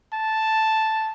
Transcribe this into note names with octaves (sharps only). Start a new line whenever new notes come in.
A5